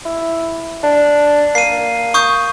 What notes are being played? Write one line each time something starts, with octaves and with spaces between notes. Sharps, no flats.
E4
D4
A#3 C7 D#7
C#6 D#6 G6